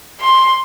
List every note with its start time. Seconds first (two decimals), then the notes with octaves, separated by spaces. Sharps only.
0.21 C6